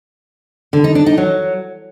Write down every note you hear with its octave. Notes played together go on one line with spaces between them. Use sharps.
D3
D#4
D4
D#4
F#3